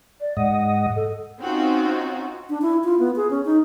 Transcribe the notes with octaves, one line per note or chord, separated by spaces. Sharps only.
D5
G#2 D#5 F#5
A4
C4 C#4 D#4 F4 F#4
D4
E4
F4
B3
G#4
C#4
D#4